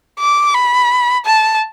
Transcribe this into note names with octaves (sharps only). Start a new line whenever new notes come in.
D6
B5
A5